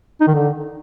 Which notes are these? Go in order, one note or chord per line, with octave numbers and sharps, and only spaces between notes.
D#4
D#3
D3